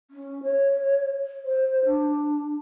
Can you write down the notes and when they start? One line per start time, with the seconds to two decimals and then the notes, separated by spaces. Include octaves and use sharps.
0.11 C#4
0.43 C#5
1.44 C5
1.85 D4